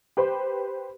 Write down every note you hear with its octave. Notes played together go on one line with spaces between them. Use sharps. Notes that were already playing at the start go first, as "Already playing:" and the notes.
G4 B4 C5